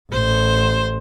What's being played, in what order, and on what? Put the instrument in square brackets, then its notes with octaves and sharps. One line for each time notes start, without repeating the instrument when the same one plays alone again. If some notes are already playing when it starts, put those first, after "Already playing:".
[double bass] A1 [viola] C5